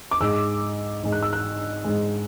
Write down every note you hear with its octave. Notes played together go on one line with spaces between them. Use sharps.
D6
G#2 G#3 E6
G#2 G#3
F#6
E6
F#6
G#2 G#3